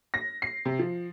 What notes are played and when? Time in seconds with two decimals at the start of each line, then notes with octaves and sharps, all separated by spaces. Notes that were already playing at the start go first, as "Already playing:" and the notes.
0.14 A#6
0.42 C7
0.65 C3
0.79 F3